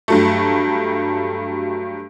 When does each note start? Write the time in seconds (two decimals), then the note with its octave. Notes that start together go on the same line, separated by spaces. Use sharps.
0.08 G2 F#3 A3